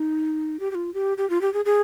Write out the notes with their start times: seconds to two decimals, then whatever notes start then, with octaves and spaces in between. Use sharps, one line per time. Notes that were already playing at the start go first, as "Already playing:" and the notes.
Already playing: D#4
0.60 G4
0.71 G4
0.75 F4
0.94 G4
1.18 G4
1.30 F4
1.41 G4
1.54 G#4
1.65 G#4